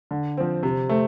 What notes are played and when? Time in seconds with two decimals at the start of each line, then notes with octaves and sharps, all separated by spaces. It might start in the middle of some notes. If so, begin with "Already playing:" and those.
0.11 D3
0.37 F3 C4
0.63 C3
0.89 A3 C4